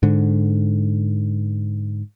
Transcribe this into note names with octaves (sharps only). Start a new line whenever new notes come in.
G#2 D3